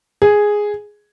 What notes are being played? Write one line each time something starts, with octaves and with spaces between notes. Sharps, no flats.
G#4